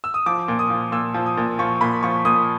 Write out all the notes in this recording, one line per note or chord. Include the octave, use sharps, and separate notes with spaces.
E6
D#6
F3 D6
A#2
D#6
F3
A#2 E6
F3
D#6
A#2
F3 C#6
A#2 B5
F3 C#6
A#2 D#6